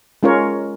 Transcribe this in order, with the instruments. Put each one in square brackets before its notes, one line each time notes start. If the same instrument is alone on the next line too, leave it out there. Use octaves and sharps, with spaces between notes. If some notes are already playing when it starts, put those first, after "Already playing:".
[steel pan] G#3 C#4 F4 A#4 C#5